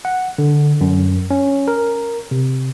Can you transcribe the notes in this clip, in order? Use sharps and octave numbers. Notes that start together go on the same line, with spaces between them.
F#5
D3
F#2
C#4
A#4
C3